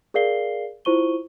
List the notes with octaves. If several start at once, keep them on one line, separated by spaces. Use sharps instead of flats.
G#4 A#4 D5 F5 C7 G7
E4 F4 C5 C#6 D#7 G7